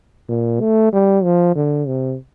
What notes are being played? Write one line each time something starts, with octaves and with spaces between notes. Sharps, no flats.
A#2
A3
G3
F3
D3
C3